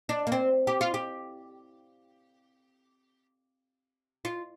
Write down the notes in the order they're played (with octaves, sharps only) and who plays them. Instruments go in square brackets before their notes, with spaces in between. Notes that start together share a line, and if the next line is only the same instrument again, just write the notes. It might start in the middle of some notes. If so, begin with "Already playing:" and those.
[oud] D4
A#3
C4
G4
F4
G4
F4